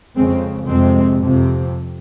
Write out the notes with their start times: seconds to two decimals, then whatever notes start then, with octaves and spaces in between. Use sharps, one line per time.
0.16 F2 C#3 G#3 C4
0.69 F2 C3 G#3 C4
1.23 F2 C3